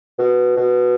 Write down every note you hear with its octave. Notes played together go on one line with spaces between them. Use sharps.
B2
B2